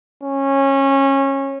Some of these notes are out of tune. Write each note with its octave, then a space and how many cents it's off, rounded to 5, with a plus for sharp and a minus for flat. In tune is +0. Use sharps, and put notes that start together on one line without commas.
C#4 -20